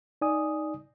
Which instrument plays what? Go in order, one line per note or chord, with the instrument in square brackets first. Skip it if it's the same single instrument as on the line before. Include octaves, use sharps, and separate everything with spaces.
[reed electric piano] D#4 D5 G#5 D#6